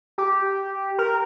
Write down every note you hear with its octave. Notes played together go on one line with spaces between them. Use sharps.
G4
A#4